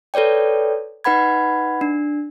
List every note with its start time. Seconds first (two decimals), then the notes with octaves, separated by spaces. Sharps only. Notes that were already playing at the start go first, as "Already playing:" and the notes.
0.14 A4 B4 C#5 D5 G5
1.04 D#4 B4 F#5 B5 G#6
1.81 D4